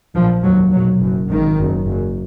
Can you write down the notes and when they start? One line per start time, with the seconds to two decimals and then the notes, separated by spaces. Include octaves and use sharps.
0.15 A#1 A#2 F3
0.44 F1 D#2 F#3
0.72 B1 A#2 F#3
1.01 F#1 F#2
1.29 G#1 G#2 D#3
1.58 F#1 F#2
1.86 F#1 F#2